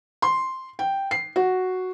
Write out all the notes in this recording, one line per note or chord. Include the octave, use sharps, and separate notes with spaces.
C6
G5
C7
F#4